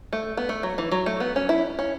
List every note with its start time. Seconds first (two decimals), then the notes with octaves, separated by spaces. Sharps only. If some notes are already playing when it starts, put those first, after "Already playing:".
0.13 A3
0.37 B3
0.49 A3
0.63 F#3
0.78 E3
0.92 F#3
1.06 A3
1.20 B3
1.36 C#4
1.49 E4
1.79 C#4